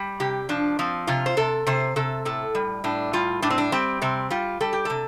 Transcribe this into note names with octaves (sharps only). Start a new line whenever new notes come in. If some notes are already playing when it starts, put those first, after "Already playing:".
Already playing: G3
C3 G4
F3 D4
F3 C4
C3 F4
C5
C3 A4
C3 C5
C3 A4
A2 A4
G3
A2 D4
G3 F4
A2 D4
C4
D4
G3 C4
C3 C4
G3 F4
G3 A4
G4
C3 A4